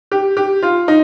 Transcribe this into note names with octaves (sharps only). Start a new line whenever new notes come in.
G4
G4
F4
D#4